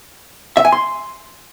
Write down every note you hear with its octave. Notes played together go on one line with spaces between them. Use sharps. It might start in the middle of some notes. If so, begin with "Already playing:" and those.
E5
G#5
C6